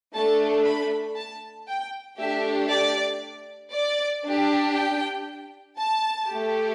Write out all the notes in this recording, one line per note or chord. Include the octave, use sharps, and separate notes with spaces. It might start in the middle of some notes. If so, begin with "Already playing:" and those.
A3 D4 A4 A5
B5
A5
G5
A3 D4 G4 E5
D5
D5
D4 G4
G5
A5
A3 G4